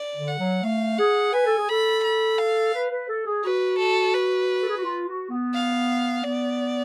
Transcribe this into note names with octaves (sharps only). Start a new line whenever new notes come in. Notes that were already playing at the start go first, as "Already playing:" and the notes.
Already playing: D5
D3
F#5
F#3
A3 F5
G#4 F#5
B4 G#5
A4
G#4
A4 B5
B5
F5
B4
B4
A4
G#4
F#4 B4
A4
B4
A4
G#4
F#4
F4
F#4
B3
F5
B3 D5